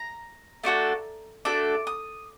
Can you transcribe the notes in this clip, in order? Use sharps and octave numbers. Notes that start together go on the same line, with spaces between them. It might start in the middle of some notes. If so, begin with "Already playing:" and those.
Already playing: A#5
A3 D4 F#4 A4
A3 D4 F#4 A4 D6
D#6